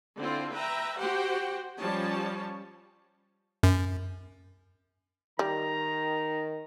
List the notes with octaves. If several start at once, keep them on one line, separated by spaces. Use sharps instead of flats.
D3 C4 E4 F4
B4 E5 G5 A#5
F#4 G4 C5 F#5 G5
F3 G3 C#4 C#5 A5
F#2
D#3 G3 A#5